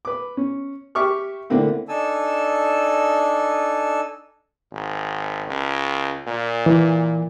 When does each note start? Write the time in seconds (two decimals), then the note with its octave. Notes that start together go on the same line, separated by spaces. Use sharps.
0.05 B4 D6
0.37 C#4
0.95 G4 E5 C#6 D6 F6
1.50 D3 A3 A#3 C4 E4
1.89 D4 D#4 A4 G#5 A5 E6
4.72 G#1
5.48 C#2
6.27 A#2
6.66 E3